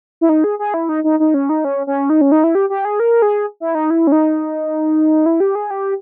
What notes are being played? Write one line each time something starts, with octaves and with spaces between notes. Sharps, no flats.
E4
D#4
G#4
G#4
E4
D#4
D#4
D#4
C#4
D#4
C#4
C#4
D#4
C#4
D#4
E4
G4
G4
G#4
A#4
G#4
E4
D#4
E4
C#4
D#4
E4
G4
G#4
G4